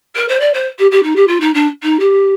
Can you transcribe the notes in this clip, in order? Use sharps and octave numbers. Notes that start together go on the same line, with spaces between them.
A#4
C5
D5
C5
G4
G4
D#4
G4
F4
D#4
D4
D#4
G4